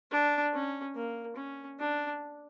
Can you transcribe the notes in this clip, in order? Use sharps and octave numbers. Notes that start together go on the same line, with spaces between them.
D4
C#4
A#3
C#4
D4